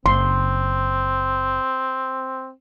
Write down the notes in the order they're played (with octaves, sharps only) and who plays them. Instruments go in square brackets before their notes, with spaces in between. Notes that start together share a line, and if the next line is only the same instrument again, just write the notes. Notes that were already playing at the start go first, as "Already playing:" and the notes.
[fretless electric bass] F#1 [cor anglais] C4 [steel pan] C6